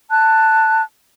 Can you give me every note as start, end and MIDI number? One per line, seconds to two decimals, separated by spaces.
0.10 0.82 81
0.10 0.82 90